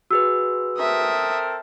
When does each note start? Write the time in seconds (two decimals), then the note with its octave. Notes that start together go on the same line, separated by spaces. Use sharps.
0.11 F#4 G#4 B4 E6
0.77 C4 A4 A#4 E5 D#6